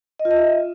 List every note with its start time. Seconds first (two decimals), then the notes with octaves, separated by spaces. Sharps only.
0.19 D#5
0.25 F4
0.31 D#5
0.37 E5